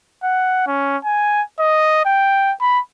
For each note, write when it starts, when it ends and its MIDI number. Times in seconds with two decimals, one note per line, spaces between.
0.23 0.63 78
0.67 0.97 61
1.05 1.42 80
1.59 2.01 75
2.05 2.52 79
2.61 2.79 83